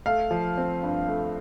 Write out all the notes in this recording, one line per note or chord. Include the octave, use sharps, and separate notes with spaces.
A3 F5
F3
C4
G2
A3